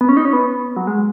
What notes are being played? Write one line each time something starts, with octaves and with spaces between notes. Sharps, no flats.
B3
C#4
D#4
C#4
B3
F#3
G#3